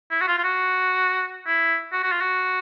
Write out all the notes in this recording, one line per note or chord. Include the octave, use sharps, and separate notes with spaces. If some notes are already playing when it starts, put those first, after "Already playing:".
E4
F#4
F4
F4
F#4
E4
F#4
F#4
F4
F#4